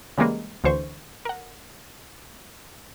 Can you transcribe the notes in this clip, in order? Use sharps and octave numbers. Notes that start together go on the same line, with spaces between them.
C#3 E3 G3 G#3 A#3
D2 D3 E3 C5 C#6
A#4 F#5